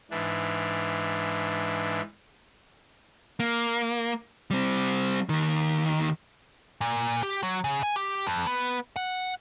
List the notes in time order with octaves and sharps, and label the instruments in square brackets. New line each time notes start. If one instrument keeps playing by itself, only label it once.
[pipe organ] G#2 E3 D4
[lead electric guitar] A#3
G3 C4
D#2 D#3
A#2
G4
F#3
C#3
G#5
G4
F2
B3
F#5